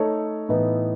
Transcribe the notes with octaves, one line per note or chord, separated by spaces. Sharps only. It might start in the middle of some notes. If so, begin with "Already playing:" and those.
Already playing: A3 D#4 A4 C#5
A2 E3 B3 D#4